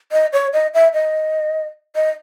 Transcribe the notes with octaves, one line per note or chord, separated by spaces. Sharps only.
D#5
C#5
D#5
E5
D#5
D#5